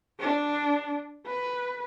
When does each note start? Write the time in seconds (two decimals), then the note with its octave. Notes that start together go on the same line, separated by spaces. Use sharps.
0.20 D4
1.26 B4